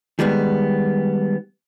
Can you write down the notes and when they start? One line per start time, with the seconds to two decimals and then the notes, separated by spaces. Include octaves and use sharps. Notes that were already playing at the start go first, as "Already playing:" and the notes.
0.19 D#3 G3 G#3 B3